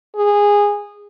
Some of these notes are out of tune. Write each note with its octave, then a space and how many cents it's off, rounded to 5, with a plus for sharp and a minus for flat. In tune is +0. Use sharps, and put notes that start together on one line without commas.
G#4 -15